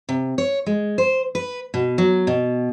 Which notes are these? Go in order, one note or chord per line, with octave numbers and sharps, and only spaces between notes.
C3
C#5
G#3
C5
B4
B2
F#3
B2